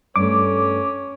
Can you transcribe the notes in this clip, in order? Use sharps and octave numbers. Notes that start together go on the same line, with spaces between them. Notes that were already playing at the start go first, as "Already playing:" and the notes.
G2 A3 C#4 D6